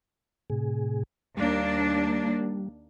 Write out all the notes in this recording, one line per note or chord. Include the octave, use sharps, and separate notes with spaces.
A2 C3 G#4
D#2 G3 A#3 D4